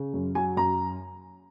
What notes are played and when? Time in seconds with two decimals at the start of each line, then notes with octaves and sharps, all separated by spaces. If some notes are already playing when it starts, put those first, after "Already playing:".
Already playing: C#3
0.14 F#2
0.35 F#3 G#5
0.57 F#2 A#5